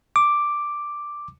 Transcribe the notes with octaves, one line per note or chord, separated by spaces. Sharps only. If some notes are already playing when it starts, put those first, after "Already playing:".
D6